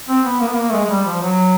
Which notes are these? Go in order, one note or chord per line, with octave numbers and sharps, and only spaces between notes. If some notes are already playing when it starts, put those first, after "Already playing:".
C4
B3
A#3
B3
A#3
A3
G#3
G#3
G3
F3
F#3